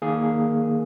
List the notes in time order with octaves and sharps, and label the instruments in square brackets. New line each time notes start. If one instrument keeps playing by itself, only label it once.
[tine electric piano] D#3 A#3 G#4